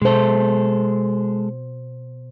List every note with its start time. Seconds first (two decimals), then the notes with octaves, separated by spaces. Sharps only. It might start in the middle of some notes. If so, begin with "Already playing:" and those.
0.02 B2 G#3 A4 C5